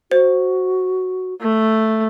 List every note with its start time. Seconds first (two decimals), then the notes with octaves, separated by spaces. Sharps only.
0.11 F#4 C5
1.41 A3